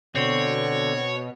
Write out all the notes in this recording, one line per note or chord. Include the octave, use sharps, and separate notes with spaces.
B2 D3 C4 C#5